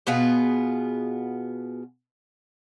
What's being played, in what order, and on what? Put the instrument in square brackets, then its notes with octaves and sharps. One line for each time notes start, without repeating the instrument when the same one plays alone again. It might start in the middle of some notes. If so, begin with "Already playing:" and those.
[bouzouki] B2 B3 F4 G#4